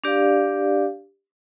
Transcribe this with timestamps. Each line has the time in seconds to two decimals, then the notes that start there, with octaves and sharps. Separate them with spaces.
0.04 D4 G4 D5 F5